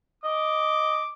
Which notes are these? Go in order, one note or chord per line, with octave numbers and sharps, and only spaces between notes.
D#5 D6